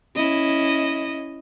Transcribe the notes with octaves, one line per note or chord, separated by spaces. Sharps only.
C#4 E4 D#5